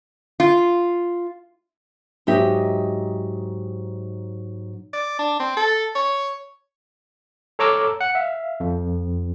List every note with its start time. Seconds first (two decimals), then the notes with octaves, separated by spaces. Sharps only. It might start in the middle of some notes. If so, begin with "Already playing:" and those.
0.40 F4
2.27 G#2 F#3 D#4 G4 E5
4.93 D5
5.19 D4
5.40 C4
5.57 A4
5.95 C#5
7.59 A4 C#5 A#5 D6 E6 F6
8.01 F#5
8.15 E5 F5
8.60 F2